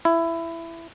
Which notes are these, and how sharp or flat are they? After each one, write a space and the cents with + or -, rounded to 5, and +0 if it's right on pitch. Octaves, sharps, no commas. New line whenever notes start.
E4 +15